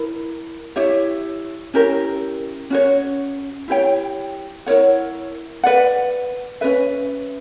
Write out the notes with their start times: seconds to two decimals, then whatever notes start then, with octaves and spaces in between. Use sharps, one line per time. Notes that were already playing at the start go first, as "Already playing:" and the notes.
Already playing: E4 A#4
0.76 E4 G4 C#5 E5
1.74 C#4 E4 G4 A#4
2.70 C#4 F#4 C#5
3.68 E4 G4 C#5 G5
4.66 E4 A#4 C#5 F#5
5.63 B4 D5 F#5
6.61 C#4 F#4 B4 E5